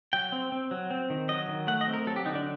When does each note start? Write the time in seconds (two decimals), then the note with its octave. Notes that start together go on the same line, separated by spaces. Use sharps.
0.13 F#3 G5
0.32 C4
0.52 C4
0.71 F#3
0.91 C4
1.10 D#3
1.29 F#3 D#5
1.48 D#3
1.67 A3 F#5
1.81 D#5
1.87 C4
1.94 A#4
2.07 F#3 A4
2.16 G4
2.26 D3 D#4
2.35 D4